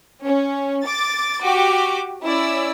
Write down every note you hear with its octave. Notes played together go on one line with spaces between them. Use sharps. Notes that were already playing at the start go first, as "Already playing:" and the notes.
C#4
D6 A6
F#4 G4 D6
C#4 E4 D5 E6